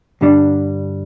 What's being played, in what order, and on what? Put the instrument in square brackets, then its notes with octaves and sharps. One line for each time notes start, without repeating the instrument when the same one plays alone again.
[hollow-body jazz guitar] G2 D3 G3 D4